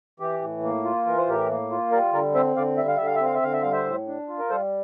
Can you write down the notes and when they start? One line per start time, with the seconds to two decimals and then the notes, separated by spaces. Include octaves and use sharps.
0.20 E3 G4
0.41 A2
0.63 A#3
0.84 F4
1.06 E3 A#4
1.18 C5
1.27 A2 G4 A#4
1.49 A#3
1.71 F4
1.92 G3 A#4 D5
2.13 D3 A#4 D5
2.35 C4 C5 E5
2.56 D3 D5 F5
2.77 G3 E5
2.88 F5
2.97 D3 E5
3.06 F5
3.15 E5
3.20 C4
3.25 F5
3.35 E5
3.42 D3 F5
3.53 E5
3.62 G3 F5
3.72 C5 E5
3.85 A2
4.07 D4
4.28 F4
4.39 A#4
4.50 G3 A4 C5